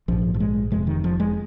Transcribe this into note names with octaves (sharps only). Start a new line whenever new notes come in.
A#1 G#2 F3
F3
G#3
F1 F2 C3 G#3
D#3
F3
G#3